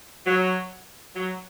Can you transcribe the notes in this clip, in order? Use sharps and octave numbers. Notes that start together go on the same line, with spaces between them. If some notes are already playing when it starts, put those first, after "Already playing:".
F#3
F#3